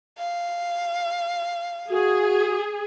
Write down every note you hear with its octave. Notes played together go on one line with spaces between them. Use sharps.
F5
F#4 G#4